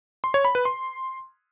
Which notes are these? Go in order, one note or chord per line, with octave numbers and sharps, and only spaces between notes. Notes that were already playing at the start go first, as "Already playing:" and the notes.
C6
C#5
B5
B4
C6